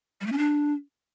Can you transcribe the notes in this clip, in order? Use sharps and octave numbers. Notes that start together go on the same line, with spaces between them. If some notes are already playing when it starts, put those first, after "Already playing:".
G3
A3
C#4
D4